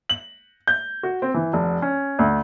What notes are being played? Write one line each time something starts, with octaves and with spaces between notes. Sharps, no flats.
F#7
G6
F#4
C4
E3
F1
C#4
D2